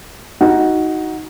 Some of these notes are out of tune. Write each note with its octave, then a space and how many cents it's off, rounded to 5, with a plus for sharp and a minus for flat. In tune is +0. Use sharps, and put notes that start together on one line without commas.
D#4 +15 F#4 +0